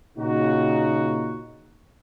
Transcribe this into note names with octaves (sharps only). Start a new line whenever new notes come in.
A#2 C#3 D#4 F#4